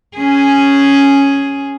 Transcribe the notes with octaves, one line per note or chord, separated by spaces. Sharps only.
C#4 G#4